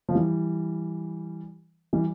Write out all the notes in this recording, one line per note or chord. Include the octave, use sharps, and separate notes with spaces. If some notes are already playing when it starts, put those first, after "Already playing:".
F3
E3 G3
E3 G3